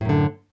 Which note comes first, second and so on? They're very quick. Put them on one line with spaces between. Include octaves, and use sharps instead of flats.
A2 F#2 D3